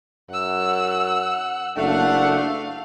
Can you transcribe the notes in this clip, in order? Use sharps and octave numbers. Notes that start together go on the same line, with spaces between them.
F#2 F#5 E6
F#1 A3 D4 F5 F#5